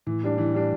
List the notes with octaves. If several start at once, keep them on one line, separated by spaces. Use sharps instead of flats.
A2 E3
G3 D4
E3
G3 D4